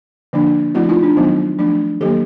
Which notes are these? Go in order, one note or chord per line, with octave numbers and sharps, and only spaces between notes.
D3 F3 A#3 D4
F3 A3 C4 E4 F#4
D#4 F4
D4
D#3 F#3 B3 D#4
F3 A3 D4
D#3 F#3 A#3 G4 A4